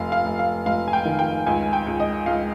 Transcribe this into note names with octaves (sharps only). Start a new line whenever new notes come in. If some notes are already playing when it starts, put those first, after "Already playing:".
Already playing: F1 F5
F5
F1
F5
F1 F5
G#5
G5
D#3
G5
C#2 G#5
G5
C#2
D#5
C#2 F5